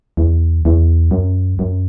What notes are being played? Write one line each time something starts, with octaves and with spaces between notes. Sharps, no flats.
E2
E2
F#2
F#2